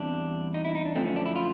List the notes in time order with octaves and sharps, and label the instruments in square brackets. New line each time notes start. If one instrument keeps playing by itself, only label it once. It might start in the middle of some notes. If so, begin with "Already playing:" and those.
Already playing: [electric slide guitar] E2 G3 C4 D4
D#4
E4
D#4
D4
F#2 D3 F3 A3 C4
C#4
D4
E4
F4